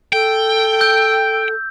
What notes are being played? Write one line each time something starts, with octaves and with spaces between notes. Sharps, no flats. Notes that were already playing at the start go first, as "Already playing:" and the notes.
A4 G5
E6 G6